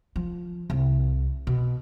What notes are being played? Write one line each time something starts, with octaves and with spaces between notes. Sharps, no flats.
F3
C2
B2